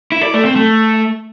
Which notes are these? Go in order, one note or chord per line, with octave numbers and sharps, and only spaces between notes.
E4
D5
A3
C4
A3